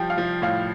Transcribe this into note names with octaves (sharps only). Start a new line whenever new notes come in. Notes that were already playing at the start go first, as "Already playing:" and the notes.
Already playing: F3 G3 G5
F5
F3
A2 F5